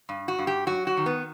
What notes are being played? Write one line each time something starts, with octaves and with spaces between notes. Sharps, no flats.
G2
F#4
G2
G4
F#3 F#4
F#4
D#3
B3